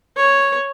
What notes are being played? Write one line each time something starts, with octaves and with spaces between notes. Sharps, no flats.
C#5